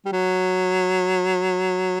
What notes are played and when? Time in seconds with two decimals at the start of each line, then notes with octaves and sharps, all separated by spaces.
0.05 G3
0.13 F#3